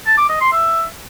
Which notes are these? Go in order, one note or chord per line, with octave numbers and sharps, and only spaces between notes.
A5
D6
D#5
C6
E5